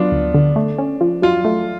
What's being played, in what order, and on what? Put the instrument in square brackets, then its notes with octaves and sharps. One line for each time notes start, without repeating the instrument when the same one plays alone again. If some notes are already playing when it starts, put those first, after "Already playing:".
Already playing: [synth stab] F#3 [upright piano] B3 D4 F4
[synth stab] D2
D3
A3
C#4
F3
[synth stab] F#3 [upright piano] F4
[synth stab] A3